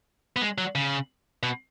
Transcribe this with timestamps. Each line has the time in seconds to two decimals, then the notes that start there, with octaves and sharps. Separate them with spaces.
0.36 B3
0.42 G#3
0.58 F#3
0.75 C#3
1.43 B2